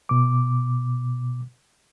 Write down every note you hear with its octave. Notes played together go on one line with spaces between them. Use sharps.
B2 D6